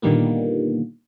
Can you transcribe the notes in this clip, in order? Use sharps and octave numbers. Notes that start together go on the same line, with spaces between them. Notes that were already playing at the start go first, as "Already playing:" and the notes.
A#2 D3 D#3 G3 A#3 B3